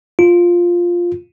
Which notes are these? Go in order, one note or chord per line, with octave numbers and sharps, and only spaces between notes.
F4